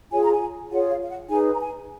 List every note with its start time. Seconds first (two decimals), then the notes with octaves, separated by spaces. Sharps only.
0.11 F4 G#4 C#5 G#5
0.22 A#5
0.32 G#5
0.71 F4 G#4 C#5 F#5
0.90 F5
1.03 F5
1.10 F#5
1.29 D#4 G#4 B4 G#5
1.54 A#5
1.59 G#5